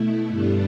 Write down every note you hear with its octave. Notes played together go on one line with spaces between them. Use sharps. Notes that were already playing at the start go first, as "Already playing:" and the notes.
Already playing: B2 A3 E4
G2 D3 G3 B3 D4